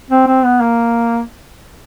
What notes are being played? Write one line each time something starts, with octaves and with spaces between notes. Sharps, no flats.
C4
C4
B3
A#3